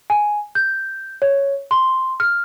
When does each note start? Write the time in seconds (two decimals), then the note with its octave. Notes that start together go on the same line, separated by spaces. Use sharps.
0.10 G#5
0.55 G6
1.22 C#5
1.71 C6
2.20 F6